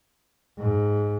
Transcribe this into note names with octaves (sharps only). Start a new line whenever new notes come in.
G#2